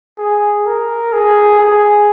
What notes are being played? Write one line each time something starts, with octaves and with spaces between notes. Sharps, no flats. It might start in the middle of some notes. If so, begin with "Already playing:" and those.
G#4
A#4
G#4
G#4